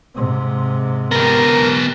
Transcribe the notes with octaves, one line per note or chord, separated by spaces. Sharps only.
G#2 C3
B3 G4 A#4